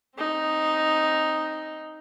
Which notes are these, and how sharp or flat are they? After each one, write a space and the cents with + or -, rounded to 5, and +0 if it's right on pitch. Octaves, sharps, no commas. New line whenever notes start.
C4 +20 D#4 +0